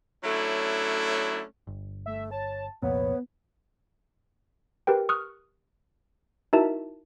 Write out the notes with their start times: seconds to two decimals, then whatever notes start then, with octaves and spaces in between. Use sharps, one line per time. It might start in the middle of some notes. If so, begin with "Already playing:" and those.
0.24 F#3 A3 C#4 D4 E4
1.67 G1
2.06 A3 E5
2.31 C#5 A5
2.82 C2 F2 A#2 B3 C#5
4.87 G4 A#4 B4 G5
5.09 C#6 D#6 F6 F#6
6.53 D#4 E4 F#4 A#4 E5 A5